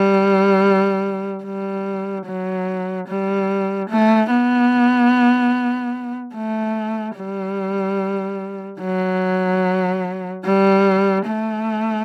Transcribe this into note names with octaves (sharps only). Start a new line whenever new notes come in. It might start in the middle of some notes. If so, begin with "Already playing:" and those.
Already playing: G3
G3
F#3
G3
A3
B3
A3
G3
F#3
G3
A3